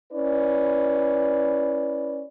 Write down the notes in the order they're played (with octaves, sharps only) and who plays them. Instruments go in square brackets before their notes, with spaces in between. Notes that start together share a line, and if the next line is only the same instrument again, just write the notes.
[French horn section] C#4 E4 B4 D5